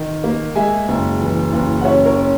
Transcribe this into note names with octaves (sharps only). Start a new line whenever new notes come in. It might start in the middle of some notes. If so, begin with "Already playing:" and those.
Already playing: D#3
A#3
G#3 E5 G#5
F#1
E3
F#1
F#5
C#4 C#5 E5
A#4 C#5
C#4